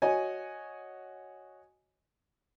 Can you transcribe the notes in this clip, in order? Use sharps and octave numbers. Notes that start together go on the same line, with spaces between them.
F#4 C#5 D#5 G#5